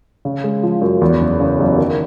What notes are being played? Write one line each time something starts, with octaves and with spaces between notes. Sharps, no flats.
C#3
G#3
F3
F#2
E2
F#1
C#3
F#1
D#3